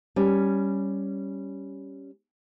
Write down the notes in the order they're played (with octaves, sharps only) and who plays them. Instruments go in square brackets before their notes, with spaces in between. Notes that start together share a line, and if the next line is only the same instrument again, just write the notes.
[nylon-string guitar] G3 C#4